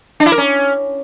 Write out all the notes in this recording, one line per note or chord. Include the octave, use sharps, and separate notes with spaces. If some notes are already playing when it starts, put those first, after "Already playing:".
D4
E4
A#4
C#4